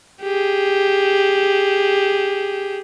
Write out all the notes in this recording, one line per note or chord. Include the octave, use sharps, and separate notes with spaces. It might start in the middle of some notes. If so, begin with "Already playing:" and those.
G4 G#4